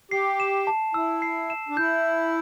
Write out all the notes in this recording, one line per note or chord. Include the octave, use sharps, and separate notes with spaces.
G4 C7
E7
A5
E4 E6
C7
E7
D4
E4 G6